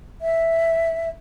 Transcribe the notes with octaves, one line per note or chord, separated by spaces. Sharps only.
E5